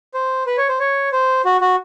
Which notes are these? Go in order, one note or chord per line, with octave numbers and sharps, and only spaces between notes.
C5
B4
C#5
C5
C#5
C5
F#4
F#4